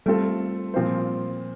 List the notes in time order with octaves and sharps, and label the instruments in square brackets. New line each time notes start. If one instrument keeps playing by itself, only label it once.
[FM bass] G3 [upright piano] A3 C4 F4 A4
[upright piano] A#2 F3 C4 F4 C5